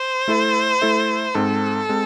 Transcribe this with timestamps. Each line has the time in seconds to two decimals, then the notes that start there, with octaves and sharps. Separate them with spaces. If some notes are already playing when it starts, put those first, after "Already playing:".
Already playing: C5
0.28 A3 E4 A4 E5
0.82 A3 E4 A4 E5
1.35 G#2 G#3 C4 A4
1.89 G#3 C4